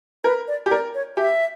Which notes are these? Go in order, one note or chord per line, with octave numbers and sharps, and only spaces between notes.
A#4 B4
D5
G4
A#4 D5
C#5
G4 E5